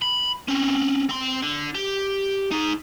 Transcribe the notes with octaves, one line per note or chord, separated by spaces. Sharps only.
B5
C4 C#4
C4 C6
D3
G4
D#4 G#4